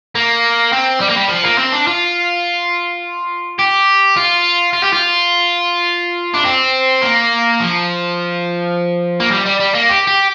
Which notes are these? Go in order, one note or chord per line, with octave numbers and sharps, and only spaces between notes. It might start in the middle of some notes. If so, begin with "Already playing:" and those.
A#3
C4
G3
A#3
G3
F3
A#3
C4
D4
F4
G4
F4
F4
G4
F4
D4
C4
A#3
F3
A#3
G3
G3
G3
A#3
G4
G4